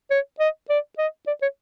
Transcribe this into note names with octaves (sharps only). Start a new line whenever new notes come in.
C#5
D#5
D5
D#5
D5
C#5